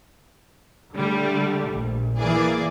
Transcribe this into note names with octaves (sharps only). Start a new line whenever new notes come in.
D3 G3 A3
A#1
E3 A#3 G#4 D5